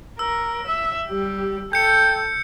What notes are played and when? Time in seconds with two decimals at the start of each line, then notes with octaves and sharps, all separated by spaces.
0.19 A#4 E6
0.67 E5
1.08 G3 G4
1.73 A4 G5 G6 C#7